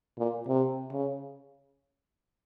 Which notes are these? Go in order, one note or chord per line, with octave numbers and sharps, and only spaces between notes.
A#2
C3
C#3